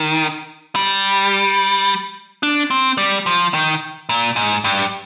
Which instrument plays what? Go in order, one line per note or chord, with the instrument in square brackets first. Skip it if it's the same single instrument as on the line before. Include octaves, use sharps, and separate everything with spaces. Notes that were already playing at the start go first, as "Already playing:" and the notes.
Already playing: [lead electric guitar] D#3
G3
D4
C4
G3
F3
D#3
A#2
G#2
G2